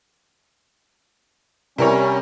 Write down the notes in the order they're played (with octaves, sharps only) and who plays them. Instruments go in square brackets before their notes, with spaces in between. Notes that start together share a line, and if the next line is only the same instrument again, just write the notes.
[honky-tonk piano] C3 A#4 C#5 [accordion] G3 C#4